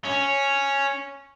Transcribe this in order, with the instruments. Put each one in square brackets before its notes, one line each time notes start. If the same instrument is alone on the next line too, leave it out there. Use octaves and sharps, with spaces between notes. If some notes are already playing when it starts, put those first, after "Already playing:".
[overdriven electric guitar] C#4